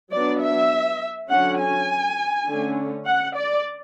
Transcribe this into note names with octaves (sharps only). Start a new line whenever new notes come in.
F#3 B3 D4 D5
E5
D3 F#3 C#4 F#5
G#5
D3 A3 C#4
F#5
D5